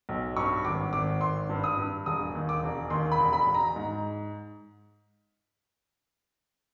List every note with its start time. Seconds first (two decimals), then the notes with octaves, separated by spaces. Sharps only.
0.09 B1
0.36 G2 C#6
0.65 G#1 D6
0.93 G#1 D6
1.21 G#1 C6
1.49 G2
1.64 D#6
1.77 G2
2.06 E1 D#6
2.35 D#2
2.49 D6
2.63 E1
2.90 D#2 C6
3.12 B5
3.19 E1
3.33 B5
3.47 E1
3.54 A#5
3.76 G#2